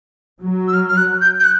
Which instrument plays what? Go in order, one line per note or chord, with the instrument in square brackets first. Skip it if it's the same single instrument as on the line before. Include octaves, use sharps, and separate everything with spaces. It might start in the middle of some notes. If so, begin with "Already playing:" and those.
[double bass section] F#3
[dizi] E6
F6
F6
F#6
G6
G6
F#6